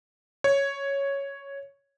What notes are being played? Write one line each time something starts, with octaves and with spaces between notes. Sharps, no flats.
C#5